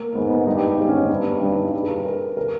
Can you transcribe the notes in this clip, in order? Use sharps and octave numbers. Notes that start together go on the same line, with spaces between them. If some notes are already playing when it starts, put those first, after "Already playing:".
Already playing: A#3
G#2 B3
B3
G2 D#4
G4
G4
G#2 B3
C#4
D#4
G2 B3
B3
G2 C#4
D#4
E4
G2
G#4
B4
A#4
A#4